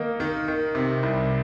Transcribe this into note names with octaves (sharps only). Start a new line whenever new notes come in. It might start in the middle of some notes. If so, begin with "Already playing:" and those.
Already playing: D#3 A#3 D#4
D#3
D#3
C3
C2